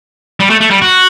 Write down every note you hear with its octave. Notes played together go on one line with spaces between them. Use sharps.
G3
A3
A3
G3
F#4